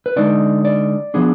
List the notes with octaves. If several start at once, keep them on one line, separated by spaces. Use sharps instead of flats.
B4
D3 G#3 D#4 D5
D5
F3 B3 D4 G#4